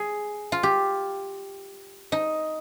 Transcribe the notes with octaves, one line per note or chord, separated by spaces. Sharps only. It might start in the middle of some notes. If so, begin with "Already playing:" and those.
Already playing: G#4
F4
G4
D#4